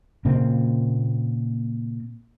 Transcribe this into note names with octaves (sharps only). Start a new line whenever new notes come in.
A#2 C#3 A#3 C4